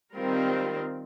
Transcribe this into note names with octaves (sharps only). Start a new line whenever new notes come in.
D#3 G3 C4 F4 A#4